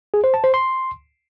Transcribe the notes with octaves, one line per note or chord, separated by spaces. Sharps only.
G#4
C5
A5
C5
C6